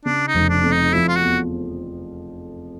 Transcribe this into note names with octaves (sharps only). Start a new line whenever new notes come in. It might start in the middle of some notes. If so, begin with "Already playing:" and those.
C#3 D4
D#4
F1
D4
F2
D#4
F3 E4
F4
F#4
E2